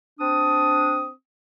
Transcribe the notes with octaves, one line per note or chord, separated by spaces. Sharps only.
C4 D4 D#6